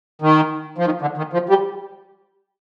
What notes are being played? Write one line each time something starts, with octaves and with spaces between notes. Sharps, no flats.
D#3
F3
D#3
D3
D#3
F3
G3